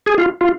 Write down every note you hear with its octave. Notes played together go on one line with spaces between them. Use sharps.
G#4
F4
F4